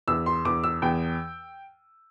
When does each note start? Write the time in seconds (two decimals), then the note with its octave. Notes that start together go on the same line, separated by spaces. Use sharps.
0.08 E2 E6
0.26 C6
0.45 E2 D6
0.64 E6
0.82 E2 G5